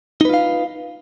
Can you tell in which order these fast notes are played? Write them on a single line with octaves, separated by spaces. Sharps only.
D#4 B4 F4 F5